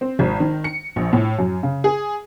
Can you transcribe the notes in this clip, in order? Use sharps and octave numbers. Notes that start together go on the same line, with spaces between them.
C4
G#1
D#3
C#7
A#1
A2
F#2
C#3
G#4